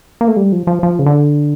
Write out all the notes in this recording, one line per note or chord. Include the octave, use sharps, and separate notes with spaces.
A#3
A3
G3
F3
F3
F3
C#3
D3